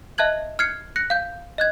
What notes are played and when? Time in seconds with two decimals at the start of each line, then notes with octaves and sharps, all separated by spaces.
0.18 D#5 E5 A5 F#6 G#6 F#7
0.59 F6 F#6 G#6 C7 C#7
0.96 F#6 A#6 C#7
1.10 F5 G6
1.58 D#5 F#6 G#6